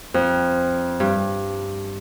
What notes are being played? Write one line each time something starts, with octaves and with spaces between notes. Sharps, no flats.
F2
G2